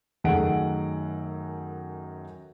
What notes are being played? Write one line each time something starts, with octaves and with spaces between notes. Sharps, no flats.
F#2 D#3 A3 G#4 F#5 D7